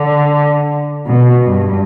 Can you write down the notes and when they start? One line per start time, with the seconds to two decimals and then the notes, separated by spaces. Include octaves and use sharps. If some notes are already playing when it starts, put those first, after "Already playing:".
Already playing: D3
1.07 B2
1.46 G2